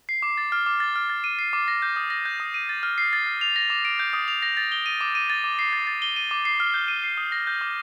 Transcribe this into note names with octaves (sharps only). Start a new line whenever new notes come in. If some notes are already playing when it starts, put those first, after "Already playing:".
C7
D6
A6
F6
D6
A6
F6
A6
D#7
C7
D6
A#6
G6
D#6
A#6
G6
D#6
D#7
A6
F6
C7
A6
F6
F7
A#6
D6
D7
G6
D#6
F7
A#6
A6
G7
D#7
D6
D#7
A6
D6
C7
A6
A6
G7
D#7
D6
C7
F6
G6
D#7
C7
D#6
A#6
G6
D6